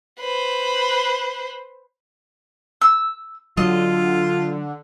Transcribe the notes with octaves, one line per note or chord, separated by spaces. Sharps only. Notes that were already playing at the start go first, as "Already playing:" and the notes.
B4 C5
E6
D3 F#3 F4 D#5